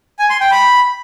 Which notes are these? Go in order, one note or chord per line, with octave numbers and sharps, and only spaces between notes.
G#5
C6
G5
B5